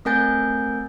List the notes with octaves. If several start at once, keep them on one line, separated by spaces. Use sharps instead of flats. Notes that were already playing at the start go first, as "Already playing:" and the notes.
A3 C4 A#4 G#5 G6 A6